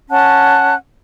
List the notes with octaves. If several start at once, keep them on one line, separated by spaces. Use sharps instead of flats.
C#4 F#5 A5 F#6